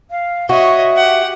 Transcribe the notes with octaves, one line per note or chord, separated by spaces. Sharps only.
F5
F#4 C#5 D#5 E5
G4 F#5